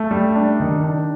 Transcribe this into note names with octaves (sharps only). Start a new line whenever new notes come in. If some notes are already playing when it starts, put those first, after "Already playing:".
Already playing: A3
G3
D4
D#3
D4